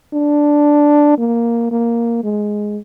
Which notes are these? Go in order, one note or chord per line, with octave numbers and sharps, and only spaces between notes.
D4
A#3
A#3
G#3